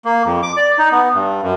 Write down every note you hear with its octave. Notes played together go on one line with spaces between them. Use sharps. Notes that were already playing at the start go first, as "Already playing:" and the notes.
A#3
F2
D6
D5
D#4
B3
G2
F#2